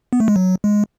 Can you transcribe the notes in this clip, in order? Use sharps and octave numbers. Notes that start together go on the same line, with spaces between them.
B3
A3
G#3
F#3
G#3